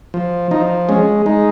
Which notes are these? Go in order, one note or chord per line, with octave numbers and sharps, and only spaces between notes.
F3
F3 D#4
G#3 C#4
G#3 D#4